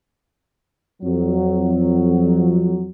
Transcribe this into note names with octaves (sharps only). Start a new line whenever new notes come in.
F2 F#3